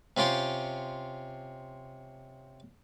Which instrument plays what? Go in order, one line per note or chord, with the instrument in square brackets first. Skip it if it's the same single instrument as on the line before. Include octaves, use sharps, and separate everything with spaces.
[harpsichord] C3 C#4 F4 G5 C6